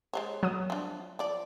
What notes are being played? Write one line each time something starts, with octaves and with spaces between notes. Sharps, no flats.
G#3 C5 C#5
F#3 D#6
F3 D4
F3 D5